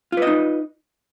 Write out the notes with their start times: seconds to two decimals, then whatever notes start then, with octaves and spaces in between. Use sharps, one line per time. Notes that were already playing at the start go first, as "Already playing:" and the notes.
0.12 F4
0.17 B4
0.22 D#5
0.27 D#4